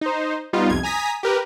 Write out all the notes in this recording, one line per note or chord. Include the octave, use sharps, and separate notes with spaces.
D#4 C5
G3 B3 D#4 F4
C2 F2 G#6
G#5 A#5 D#6 B6
G4 A#4 B4